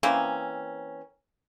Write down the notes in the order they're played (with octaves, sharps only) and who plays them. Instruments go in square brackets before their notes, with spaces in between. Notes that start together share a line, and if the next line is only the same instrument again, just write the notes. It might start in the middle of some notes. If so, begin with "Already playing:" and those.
[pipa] E3 A#3 C4 C#4